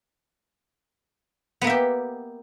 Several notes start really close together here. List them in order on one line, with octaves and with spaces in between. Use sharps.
B3 A#3 E5 G4